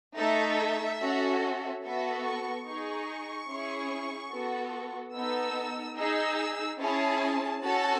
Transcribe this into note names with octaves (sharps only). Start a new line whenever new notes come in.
A3 D#4 A4 E5
C#4 F#4 A4
B3 F#4 A4 E5
C#6
D#4 G#4 C#6
C#4 E4 G#4
B3 F#4 A4
B3 D#4 A4 E6
D#4 G#4 E6
C#4 E4 G#4 A5
C#4 F#4 A4 A5